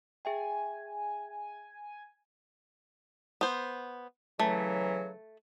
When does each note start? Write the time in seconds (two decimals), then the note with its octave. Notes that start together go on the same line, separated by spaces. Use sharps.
0.25 G#4 E5 G5 G#5
3.41 B3 C5
4.39 C#3 E3 F#3 A3